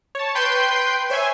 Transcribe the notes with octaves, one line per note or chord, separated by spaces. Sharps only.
C#5 A5
B4 G5 C6 G6
C5 C#5 E5 G#5